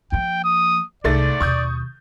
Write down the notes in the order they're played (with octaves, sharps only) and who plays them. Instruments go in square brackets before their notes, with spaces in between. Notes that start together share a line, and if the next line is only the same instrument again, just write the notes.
[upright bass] F3 A#3 [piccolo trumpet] G5
[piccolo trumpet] D#6
[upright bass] C2 [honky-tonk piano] G#2 A3 A6 [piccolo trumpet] D5
[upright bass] D#2 B2 [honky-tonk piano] C#6 D#6 G6